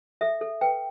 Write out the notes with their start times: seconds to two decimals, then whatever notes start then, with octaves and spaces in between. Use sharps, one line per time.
0.21 A4 E5
0.41 A4
0.61 B4 G5